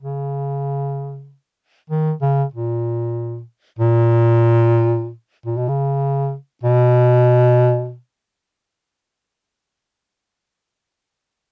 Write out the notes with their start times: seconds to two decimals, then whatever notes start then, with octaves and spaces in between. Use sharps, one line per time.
0.01 C#3
1.90 D#3
2.21 C#3
2.53 A#2
3.79 A#2
5.46 A#2
5.57 B2
5.69 C#3
6.63 B2